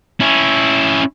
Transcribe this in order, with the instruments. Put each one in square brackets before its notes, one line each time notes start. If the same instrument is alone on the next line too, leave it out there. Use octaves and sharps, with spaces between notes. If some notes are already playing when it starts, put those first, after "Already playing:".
[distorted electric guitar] C#4 E4